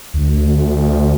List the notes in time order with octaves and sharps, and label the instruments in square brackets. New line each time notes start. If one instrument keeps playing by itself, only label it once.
[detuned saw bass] D2